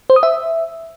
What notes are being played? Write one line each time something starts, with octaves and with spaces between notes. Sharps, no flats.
C5
D#6
E5